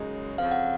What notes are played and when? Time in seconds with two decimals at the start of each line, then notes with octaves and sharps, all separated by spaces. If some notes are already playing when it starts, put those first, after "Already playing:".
Already playing: F#2 C#3 G#3 D#4
0.38 F2 C#3 F3 C4 F5
0.51 F#5